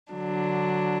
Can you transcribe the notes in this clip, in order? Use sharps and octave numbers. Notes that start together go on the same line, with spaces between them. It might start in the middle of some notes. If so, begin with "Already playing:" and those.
D3 F#3 D4